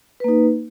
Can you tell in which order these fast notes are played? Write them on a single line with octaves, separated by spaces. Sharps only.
B4 A#3 D#4